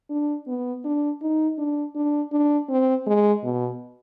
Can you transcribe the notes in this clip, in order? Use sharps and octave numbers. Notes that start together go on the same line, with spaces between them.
D4
B3
D4
D#4
D4
D4
D4
C4
G#3
B2